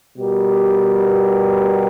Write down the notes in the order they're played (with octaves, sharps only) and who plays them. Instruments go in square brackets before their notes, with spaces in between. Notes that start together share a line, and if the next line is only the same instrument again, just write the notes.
[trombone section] B2 G3 B3 G4 A#4